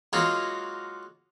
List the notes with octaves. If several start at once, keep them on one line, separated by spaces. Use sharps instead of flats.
F#3 G#3 A#3 D#4 F4 F#4